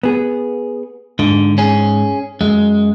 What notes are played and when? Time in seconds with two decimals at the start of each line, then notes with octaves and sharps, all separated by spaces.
0.03 B3 G#4
1.19 G#2 D3
1.58 C#4 G#4
2.41 F#2 G#3